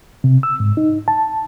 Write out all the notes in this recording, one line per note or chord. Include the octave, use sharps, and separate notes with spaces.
C3
E6
G#2
D#4
A5